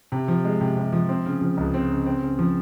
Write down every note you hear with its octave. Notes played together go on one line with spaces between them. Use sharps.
C3
F3
G#3
C3
C3
F3
C4
C#3
F3
C#2
C4
C#3
C4
C#3
F3